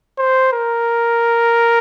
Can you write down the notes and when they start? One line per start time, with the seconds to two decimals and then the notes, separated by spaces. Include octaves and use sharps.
0.19 C5
0.53 A#4